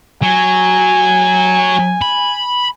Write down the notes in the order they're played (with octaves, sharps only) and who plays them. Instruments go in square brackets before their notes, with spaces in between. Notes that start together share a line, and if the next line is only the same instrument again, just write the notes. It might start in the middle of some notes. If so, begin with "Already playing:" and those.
[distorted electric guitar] F#3 [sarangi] G#5
[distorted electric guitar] B5